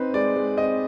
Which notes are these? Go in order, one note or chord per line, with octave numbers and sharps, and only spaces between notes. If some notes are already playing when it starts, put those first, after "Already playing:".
Already playing: C4 D#4 B4
G#3 D5
G#3
C4 D#5